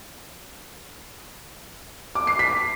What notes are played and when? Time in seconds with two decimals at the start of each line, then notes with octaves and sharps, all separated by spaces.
2.15 D6
2.27 C7
2.39 B6